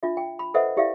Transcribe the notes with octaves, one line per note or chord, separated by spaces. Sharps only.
D4 F4 E5
G5
B5
A4 B4 C5 D#5 E5 F#5
E4 G4 D5 E5 F5